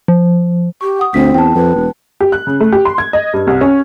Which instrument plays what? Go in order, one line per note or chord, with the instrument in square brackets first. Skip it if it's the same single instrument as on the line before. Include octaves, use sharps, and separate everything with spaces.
[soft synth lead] F3
[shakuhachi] G4 [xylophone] C#6
[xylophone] F#5 D#6
[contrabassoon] D2 [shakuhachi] C4 [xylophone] B6
[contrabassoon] E2 [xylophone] G5 A5
[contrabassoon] F2 [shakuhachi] B4
[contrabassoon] E1
[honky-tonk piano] G4
F#6
C#3
A3
G4
C6
G#6
D#5
G2
C2
C#4